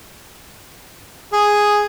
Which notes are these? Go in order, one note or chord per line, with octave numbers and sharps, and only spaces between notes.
G#4